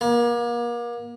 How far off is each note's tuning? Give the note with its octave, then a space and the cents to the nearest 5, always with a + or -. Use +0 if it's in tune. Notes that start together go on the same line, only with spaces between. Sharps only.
A#3 +35